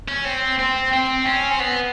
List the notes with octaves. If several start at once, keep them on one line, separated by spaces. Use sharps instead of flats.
C#4
C4
C4
C4
C#4
C4
B3